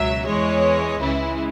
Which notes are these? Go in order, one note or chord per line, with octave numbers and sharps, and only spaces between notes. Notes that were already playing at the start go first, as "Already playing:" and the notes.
Already playing: C#2 B2 F#3 E5
E2 E3 G#3 C#5
C#2 C#3 E3 G#3 E4